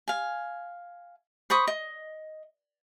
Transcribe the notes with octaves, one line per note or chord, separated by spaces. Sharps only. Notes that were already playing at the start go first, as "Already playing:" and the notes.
F5 G#5
C5 B5 C#6 D#6
D#5